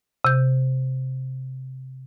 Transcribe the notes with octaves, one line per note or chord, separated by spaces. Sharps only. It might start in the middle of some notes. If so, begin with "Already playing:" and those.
C3 G6